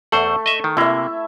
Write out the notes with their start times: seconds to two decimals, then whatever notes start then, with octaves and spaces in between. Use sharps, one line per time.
0.12 E2 A3 C5 F#5
0.46 D#5 E5
0.64 D#3
0.77 C3 A#3 E4 E5